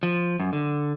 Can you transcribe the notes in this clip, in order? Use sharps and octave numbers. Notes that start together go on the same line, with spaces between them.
F3
F#2
D3